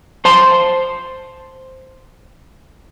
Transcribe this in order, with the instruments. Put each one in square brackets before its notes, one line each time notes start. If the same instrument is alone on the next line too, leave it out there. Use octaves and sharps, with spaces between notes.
[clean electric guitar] C5 A5 C6